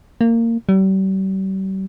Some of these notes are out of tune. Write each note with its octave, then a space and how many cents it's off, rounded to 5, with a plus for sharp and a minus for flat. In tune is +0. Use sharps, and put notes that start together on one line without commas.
A#3 -20
G3 -40